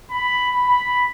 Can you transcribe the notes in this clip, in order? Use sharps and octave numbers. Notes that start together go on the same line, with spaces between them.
B5
B5